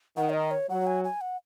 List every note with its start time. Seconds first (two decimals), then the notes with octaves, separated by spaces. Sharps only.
0.17 D#3 F#5
0.30 C#5
0.34 D#5
0.51 C#5
0.69 F#3 F#5
0.87 G#5
1.04 G#5
1.21 F#5